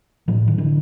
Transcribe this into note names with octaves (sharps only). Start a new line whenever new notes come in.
A2 E3 F#3
D#3
D3 E3